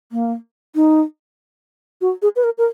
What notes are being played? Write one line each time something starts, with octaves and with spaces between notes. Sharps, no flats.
A#3
D#4
F#4
G#4
B4
A#4
A#4